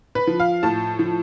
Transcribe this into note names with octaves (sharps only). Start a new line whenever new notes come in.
B4
F3
F5
A2 A5
F3